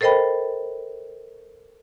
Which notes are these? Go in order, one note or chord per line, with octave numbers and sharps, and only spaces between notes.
A4 A#4 C5 D#5 G5 B5